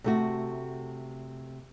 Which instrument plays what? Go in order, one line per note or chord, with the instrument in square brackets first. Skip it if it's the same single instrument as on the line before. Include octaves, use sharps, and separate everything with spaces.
[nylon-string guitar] C3 A3 F#4